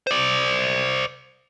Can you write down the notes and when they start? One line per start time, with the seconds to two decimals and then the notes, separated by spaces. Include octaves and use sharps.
0.07 C5 D5